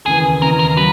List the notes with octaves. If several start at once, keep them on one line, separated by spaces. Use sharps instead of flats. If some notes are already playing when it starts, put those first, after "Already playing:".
D#2 C#3 E3 G#4
D#2 C#3 E3 A#4
A#4
F#3 B4